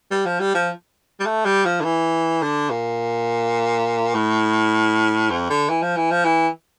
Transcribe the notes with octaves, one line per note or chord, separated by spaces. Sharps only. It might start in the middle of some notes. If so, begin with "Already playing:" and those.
G3
F3
G3
F3
G3
A3
G3
F3
D3
E3
D3
A#2
A2
F2
D3
E3
F3
E3
F3
E3